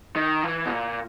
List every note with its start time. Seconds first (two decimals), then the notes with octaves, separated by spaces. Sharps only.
0.16 D#3
0.44 E3
0.66 B2
0.72 A#2